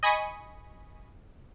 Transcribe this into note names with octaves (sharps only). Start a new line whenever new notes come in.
D#5 G#5 B5 C#6 D#6